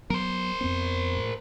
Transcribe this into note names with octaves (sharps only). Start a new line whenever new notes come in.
F#3 B3 A#4 C5
F2 B3 C4
A2